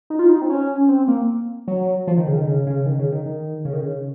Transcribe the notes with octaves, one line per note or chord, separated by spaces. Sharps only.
D#4
F4
D#4
C4
C#4
C4
A#3
F#3
F3
D#3
C#3
D#3
C#3
C#3
D#3
C#3
D#3
D#3
C#3
D#3
C#3